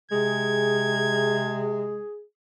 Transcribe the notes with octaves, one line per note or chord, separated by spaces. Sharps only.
C3 G#3 G#4 G#6